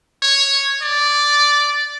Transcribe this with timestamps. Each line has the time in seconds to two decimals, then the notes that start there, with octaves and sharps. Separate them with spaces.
0.23 C#5
0.82 D5